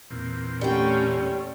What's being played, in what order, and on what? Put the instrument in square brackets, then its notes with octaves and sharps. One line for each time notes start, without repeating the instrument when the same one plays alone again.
[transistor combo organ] E2 A#2 C4
[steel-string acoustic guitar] G3 G5 [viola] A3 C#4